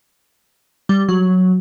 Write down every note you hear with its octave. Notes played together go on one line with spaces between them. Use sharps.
G3
F#3